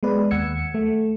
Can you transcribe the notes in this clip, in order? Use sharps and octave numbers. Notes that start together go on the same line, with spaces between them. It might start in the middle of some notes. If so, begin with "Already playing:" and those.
G#3 B3 B4 D5
D#2 F#5 E6 G#6 C#7
A3